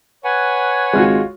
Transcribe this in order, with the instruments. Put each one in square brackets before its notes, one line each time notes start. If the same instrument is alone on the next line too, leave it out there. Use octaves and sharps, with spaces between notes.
[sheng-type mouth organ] B4 F#5 G#5 [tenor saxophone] C#5
[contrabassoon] G#1 [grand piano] G#3 F4 F#4